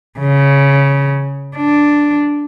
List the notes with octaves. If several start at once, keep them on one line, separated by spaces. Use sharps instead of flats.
C#3
D4